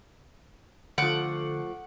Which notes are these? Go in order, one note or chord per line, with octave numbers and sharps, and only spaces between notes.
D3 F3 A3 F#5 D6